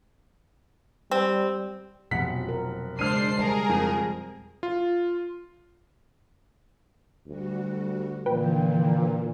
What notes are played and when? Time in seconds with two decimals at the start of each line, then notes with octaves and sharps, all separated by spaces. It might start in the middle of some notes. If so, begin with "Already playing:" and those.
1.11 G3 C4
2.11 F1 B2 F3 F#3 F#5 B6
2.49 A#4
2.99 C#3 G#3 D4 C5 F6 C7 D#7
3.39 G3 G#4 A#4 A5
3.69 F2
4.63 F4
7.27 D2 G3 F#4
8.26 A#2 D3 E3 F3 B4 G5